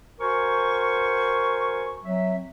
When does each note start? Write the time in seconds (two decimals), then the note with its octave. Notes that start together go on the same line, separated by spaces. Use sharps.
0.20 F#4 A#4 C5 G#5 C#6
2.04 F#3 C4 E5